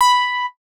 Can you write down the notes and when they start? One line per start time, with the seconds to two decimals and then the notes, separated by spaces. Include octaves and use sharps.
0.01 B5